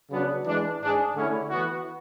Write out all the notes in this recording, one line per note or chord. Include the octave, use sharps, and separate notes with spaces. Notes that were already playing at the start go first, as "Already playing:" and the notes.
C#3 F#3 B3 D4
E3 G#3 D4
G#2 G#3 D4 G#4
D3 A3 C#4 E4
E3 B3 F#4